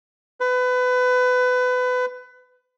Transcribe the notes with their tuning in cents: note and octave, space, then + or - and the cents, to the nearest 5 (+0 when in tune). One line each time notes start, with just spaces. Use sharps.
B4 +25